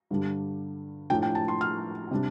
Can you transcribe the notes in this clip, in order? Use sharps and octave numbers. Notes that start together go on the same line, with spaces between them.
G2 D3 G3 D4
A2 F3 D4 G5
G5
A5
C6
F6
C3 G3 D4